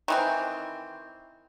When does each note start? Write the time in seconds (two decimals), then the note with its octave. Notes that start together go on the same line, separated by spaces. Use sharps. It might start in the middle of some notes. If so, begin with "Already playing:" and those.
0.08 D#3 E3 C4